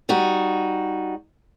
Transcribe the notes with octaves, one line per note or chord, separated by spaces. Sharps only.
G3 D#4 F#4